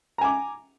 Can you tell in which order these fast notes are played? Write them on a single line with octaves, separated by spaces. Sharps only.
A#5 G#5 D6